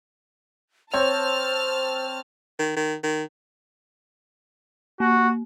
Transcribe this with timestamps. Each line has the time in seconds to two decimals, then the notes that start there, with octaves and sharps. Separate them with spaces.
0.94 C4 C5 C#5 A5 F6
2.59 D#3
2.77 D#3
3.03 D#3
5.00 A#3 F#4